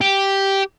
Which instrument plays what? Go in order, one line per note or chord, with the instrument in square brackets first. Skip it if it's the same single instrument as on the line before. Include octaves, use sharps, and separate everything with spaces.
[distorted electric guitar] G4